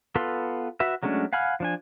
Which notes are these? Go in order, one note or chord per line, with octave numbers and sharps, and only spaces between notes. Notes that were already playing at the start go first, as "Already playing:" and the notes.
B3 F4 A4 B4 C6
F#4 B4 E5
F#3 G#3 A3 C#4 D4
F5 F#5 G#5 B5 F6
F3 D4 G#5